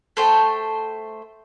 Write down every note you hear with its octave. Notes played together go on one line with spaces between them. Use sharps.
A3 C5 G5